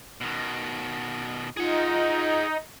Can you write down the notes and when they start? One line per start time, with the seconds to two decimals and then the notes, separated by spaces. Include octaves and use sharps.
0.21 B2 D#3
1.57 D#4 F4 G#4 F#5